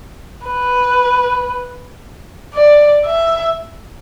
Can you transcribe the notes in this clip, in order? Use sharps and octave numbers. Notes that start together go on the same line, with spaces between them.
B4
D5
E5